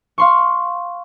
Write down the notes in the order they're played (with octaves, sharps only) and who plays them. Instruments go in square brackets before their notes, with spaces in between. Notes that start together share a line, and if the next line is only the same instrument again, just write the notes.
[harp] F5 C6 C#6